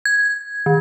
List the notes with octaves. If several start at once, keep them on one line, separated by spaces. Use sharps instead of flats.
G#6
D#3